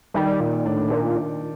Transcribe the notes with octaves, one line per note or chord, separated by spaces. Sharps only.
D#3 G3
A#2
A2 D4
A#2